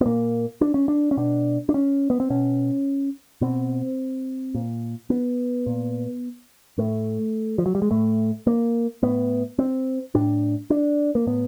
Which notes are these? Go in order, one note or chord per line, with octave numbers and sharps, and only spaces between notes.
B3
A#2 A#3
D4
C#4
D4
C#4
B2 D4
D4
C#4
B3
C4
B2 C#4
B2 C4
A#2
B3
A#2
A2 A3
F3
F#3
G3
G#3
A2 A3
A#3
A2 B3
C4
A2 D4
D4
A#3
A2 B3